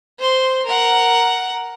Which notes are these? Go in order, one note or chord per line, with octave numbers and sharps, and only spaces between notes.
C5 C6
A#4 F#5